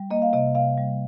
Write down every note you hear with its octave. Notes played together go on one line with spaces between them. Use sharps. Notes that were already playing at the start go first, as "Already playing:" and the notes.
Already playing: G3
A#3 D#5
F5
C3 D#5
C3 F5
G3